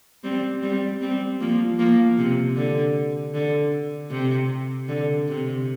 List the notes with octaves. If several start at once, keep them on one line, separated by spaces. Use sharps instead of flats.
G3 C4
G3 C4
G3 C4
F3 A#3
F3 A#3
C3
D3
D3
C3
D3
C3